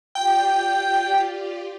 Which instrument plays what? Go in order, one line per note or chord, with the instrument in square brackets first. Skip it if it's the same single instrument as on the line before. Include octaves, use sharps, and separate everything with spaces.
[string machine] F4 G4 D5 [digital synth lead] G5